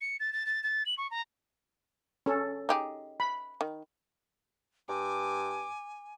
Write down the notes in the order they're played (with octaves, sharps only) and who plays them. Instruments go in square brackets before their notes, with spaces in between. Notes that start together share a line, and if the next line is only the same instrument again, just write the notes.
[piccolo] C#7
A6
A6
A6
A6
F#7
C#6
A#5
[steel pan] C#4 A4
[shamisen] D#4 G4 G#4
[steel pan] B5
[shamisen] D#3
[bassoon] G2 [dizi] G#5 [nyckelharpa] D6